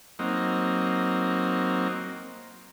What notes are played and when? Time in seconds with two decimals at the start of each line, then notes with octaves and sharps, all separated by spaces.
0.19 F#3 A#3 C4 D#4